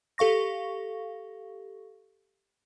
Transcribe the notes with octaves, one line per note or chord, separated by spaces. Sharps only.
G4 A4 F5 C#6 A#6